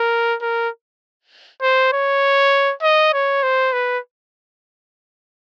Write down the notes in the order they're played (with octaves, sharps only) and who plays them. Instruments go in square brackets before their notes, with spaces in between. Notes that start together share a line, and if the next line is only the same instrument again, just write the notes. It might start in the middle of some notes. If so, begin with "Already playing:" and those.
Already playing: [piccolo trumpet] A#4
A#4
C5
C#5
D#5
C#5
C5
B4